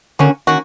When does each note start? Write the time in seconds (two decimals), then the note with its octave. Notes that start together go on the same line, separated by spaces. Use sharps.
0.19 D3 A#3 C#4 F#4
0.47 D#3 A#3 C#4 F#4